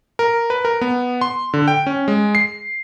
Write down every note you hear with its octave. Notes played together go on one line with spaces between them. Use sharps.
A#4
B4
A#4
B3
C6
D3
G5
C#4
G#3
C7